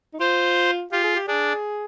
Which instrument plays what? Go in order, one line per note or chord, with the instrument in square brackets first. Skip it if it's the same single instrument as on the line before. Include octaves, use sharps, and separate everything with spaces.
[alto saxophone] D#4
[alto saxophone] F4 [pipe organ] C5
[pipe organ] F4 [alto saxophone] G4
[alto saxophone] G#4
G4
[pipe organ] D4 [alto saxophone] G#4